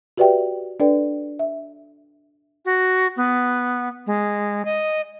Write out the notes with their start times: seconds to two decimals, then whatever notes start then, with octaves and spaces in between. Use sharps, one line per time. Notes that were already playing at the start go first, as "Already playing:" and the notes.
0.17 F#4 G4 B4 D5 E5 G5
0.80 D4 A4 B4 D5 G5
1.39 E5
2.65 F#4
3.17 B3
4.07 G#3
4.65 D#5